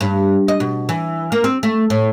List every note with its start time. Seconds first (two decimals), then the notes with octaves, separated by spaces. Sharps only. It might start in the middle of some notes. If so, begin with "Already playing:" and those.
0.01 G2
0.48 D#5
0.60 B2
0.89 E3
1.32 A#3
1.44 C4
1.63 A3
1.90 A2